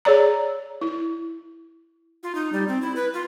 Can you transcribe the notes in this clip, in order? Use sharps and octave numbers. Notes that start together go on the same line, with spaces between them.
G#4 C#5 D5 A#5
E4
F4
D#4
G3
C4
E4
B4
F4